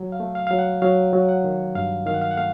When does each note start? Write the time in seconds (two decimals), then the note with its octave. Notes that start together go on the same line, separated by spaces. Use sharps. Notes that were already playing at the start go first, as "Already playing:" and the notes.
Already playing: F#3
0.12 F5
0.20 A3
0.35 F5
0.47 F#3 F5
0.59 F#5
0.82 F#3 F5
1.13 F#3
1.29 F#5
1.44 D#3
1.75 G2 F5
2.06 D#3 F5
2.14 F#5
2.21 F5
2.31 F#5
2.37 A3 F5